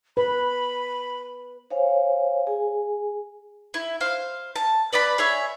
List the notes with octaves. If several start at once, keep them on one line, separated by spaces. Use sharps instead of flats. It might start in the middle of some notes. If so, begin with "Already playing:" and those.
B4 B5
C5 C#5 F5 G#5
G#4 G#5
E4
C5 F5
A5
B4 D5 A5 B5
G#4 C#5 E5